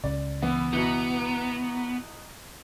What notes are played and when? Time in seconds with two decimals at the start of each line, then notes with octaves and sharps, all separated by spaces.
0.04 C#2 C#3 D5
0.42 E3 B3
0.73 B2 E3 B3 A#5